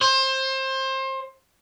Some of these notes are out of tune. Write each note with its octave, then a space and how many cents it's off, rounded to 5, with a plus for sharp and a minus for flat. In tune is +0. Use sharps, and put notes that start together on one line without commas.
C5 +25